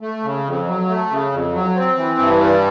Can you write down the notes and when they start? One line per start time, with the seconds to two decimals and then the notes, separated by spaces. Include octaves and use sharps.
0.01 A3
0.23 C#3
0.44 F2
0.67 F#3
0.88 A3
1.10 C#3
1.32 F2
1.54 F#3
1.75 C4
1.96 E3
2.19 G2
2.40 G3